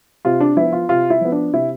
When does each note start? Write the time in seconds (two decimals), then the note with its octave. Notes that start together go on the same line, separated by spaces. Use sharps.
0.25 C3 F4
0.40 D4
0.56 F3 B3 E4
0.73 F4
0.89 C3 F4
1.10 E4
1.21 F3 B3
1.32 D4
1.53 C3 E4